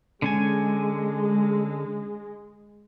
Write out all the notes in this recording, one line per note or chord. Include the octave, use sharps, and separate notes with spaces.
D3 G#3 C#4 G#5